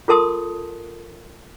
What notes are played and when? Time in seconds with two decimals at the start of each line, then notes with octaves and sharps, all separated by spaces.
0.08 F4 A4 A#4 A5 C6 D#6